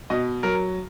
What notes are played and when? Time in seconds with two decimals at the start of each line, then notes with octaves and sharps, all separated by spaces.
0.10 B2 D#5
0.43 F#3 A#4